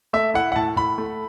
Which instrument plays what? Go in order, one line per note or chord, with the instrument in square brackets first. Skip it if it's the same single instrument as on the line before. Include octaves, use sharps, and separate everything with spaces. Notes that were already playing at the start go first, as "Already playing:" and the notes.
[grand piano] A3 E5
E4 F#5
F#5
A2 A5
A2 B5
A3